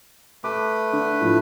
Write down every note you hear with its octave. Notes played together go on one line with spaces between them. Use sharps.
A3 B4 D6
D3
A2 F3